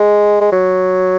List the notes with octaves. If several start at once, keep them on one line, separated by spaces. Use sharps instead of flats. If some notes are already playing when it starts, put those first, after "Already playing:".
Already playing: G#3
G#3
F#3